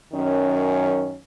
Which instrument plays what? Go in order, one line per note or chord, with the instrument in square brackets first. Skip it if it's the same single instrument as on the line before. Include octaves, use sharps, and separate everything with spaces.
[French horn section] F#2 D#3 C#4